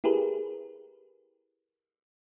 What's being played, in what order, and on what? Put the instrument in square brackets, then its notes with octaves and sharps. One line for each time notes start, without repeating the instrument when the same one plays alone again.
[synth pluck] E4 G4 G#4 A#4 B4